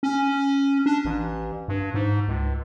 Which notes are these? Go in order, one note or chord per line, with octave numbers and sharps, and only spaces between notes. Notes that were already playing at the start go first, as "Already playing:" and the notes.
C#4
D4
A1
G2
G#2
C#2